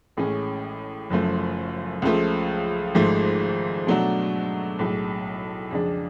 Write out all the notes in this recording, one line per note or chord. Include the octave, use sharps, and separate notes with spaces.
A1 A2 G#3 C#4
F#1 F#2 F3 A3
C#2 C#3 F3 A3
G#1 G#2 F3 A3
B2 F#3 A3 D4 F#4
B1 A2 G#3
F2 C#3 G#3 D4